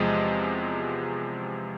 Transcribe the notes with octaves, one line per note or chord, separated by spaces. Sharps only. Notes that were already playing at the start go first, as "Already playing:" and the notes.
Already playing: E2 C3 F3 G#3 D#5